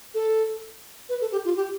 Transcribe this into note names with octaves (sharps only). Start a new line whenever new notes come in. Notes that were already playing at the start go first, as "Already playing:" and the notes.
A4
B4
A4
G4
F4
G4